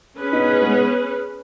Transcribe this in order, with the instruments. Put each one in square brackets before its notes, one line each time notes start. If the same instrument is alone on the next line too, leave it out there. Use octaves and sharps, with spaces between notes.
[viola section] C#4 G#4 B4
[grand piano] B3 D#4
G#3 B3